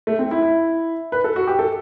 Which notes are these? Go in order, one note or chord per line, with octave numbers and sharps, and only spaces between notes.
A3
C4
E4
E4
B4
A4
F#4
G4
A4